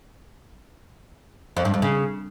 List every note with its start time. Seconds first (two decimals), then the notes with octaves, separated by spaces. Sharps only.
1.57 F2
1.65 G2
1.74 F2
1.82 C#3